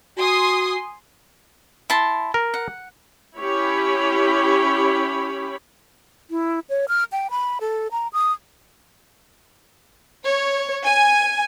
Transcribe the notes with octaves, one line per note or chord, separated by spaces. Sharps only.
F#4 G#5 C6 D#6
E4 A5 C6
A#4
F#5
C#4 E4 G4 C#5 B5
E4
C#5
F6
G5
B5
A4
A#5
D#6
C#5
G#5